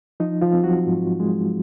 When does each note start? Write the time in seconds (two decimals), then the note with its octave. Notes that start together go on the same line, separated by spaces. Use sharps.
0.20 F3 D#4
0.41 F3 F4
0.53 C4
0.64 F#3 F#4
0.86 G#2
1.20 G#3